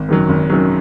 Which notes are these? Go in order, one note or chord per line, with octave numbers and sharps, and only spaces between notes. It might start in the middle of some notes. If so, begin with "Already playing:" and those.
Already playing: G#1
F#2 D#3 F#3
G#1
F#2 D#3 F#3